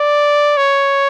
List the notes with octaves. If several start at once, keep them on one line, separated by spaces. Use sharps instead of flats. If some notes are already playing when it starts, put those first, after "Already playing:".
Already playing: D5
C#5